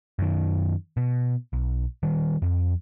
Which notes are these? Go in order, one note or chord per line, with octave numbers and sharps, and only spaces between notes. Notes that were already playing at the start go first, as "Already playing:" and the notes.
F#2 D#3
B2
B1
D#3 G3
F2